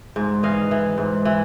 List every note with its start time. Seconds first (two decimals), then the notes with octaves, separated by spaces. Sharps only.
0.16 G#2
0.43 E3 D#5 F5
0.71 E3
0.98 G#2
1.25 E3